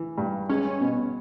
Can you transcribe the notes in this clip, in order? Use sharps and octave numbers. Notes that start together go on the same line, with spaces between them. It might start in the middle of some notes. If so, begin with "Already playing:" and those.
Already playing: E3
G2
G#3 C#4
B2